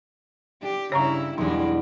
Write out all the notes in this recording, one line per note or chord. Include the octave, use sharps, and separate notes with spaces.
D4 G4
G2 C#3 E4 C#5 F5 A#5 C#6
B1 E2 G3 G#3 D4 D#4